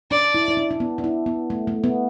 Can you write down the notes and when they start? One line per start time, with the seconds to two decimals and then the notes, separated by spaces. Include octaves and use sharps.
0.11 D4 D5
0.34 E4
0.48 E4
0.57 D4
0.71 D4
0.80 B3
0.98 D4
1.04 E4
1.26 B3
1.50 A3
1.67 A3
1.84 B3